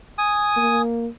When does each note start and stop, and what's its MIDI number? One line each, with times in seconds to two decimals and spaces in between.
0.18 0.82 80
0.18 0.82 87
0.57 1.07 58